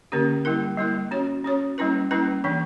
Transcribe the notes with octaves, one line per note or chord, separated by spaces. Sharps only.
D3 A#3 C#4 G4
G3 A#3 E4 A#4
G3 A#3 E4 A#4
C#4 F#4 C#5
C#4 F#4 C#5
G3 A#3 C#4 E4 B4
G3 A#3 C#4 E4 B4
E3 A#3 D4